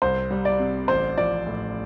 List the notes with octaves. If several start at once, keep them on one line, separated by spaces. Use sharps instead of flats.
C2 C5
G3
D5
C3
A1 C5
F3 D5
A2